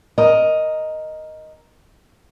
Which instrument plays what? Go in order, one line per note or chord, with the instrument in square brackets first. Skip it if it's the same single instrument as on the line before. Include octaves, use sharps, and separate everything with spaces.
[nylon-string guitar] A#4 D#5